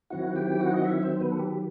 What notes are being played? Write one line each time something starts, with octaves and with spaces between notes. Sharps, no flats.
D#3 F#3 C4 E4 F#4 F#5
G4 G5
F#4 F#5
D#5
E4 E5
C4 C5
B3 B4
A4
G4